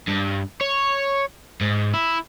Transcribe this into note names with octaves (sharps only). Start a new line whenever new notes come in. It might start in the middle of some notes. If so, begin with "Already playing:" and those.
G2
C#5
G#2
E4